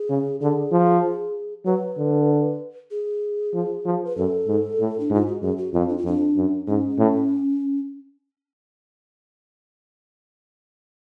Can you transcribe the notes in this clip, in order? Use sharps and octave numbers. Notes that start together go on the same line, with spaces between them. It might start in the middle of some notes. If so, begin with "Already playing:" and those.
Already playing: G#4
C#3
D3 G#4
F3
F#3 B4
D3
G#4
F3
F3
B4
F#2 A4
G#2
A2
D4
G#2 F4
F#4
F#2 G#4
F#4
F2 F4
D4
F4
F2 D4
F#2
G#2 C#4
A2